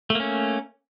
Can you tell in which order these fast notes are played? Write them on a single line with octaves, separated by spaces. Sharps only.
A3 A#3 C#4